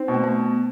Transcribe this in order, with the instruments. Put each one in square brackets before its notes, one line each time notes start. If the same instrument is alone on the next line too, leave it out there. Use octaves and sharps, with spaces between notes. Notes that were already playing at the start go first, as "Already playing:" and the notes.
Already playing: [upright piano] C4 [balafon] D#4
[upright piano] B2
[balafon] A3
B3